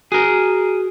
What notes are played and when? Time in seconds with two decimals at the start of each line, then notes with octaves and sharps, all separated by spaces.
0.12 F#4 G#4 A#4